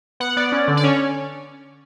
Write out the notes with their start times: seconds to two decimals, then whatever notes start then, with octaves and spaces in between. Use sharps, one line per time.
0.20 B3 F#5
0.37 B3 D5
0.52 C#4
0.68 D3
0.77 D5
0.84 C#4 C#5